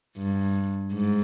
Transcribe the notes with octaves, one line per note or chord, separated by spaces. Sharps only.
G2
G#2